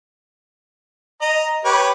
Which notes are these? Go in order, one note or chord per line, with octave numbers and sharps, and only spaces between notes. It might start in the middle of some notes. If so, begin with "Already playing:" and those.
D#5 A#5
G4 B4 C#5